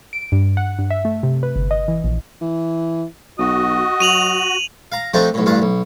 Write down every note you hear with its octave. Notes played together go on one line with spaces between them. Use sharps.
D7
G2
F#5
G2
E5
A3
C3
B4
G1
D#5
E3
A#1
E3
B1 F#4 D#5
F#3 D#7 F7 F#7
F5 A#5
F3 A3 C4 D4 D#4 G4
B1 A2
A1 G2 D4 F5
B1